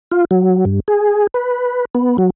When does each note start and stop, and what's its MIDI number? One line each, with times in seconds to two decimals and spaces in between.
0.11 0.25 65
0.31 0.65 54
0.65 0.80 43
0.88 1.27 68
1.34 1.85 71
1.95 2.17 59
2.18 2.30 54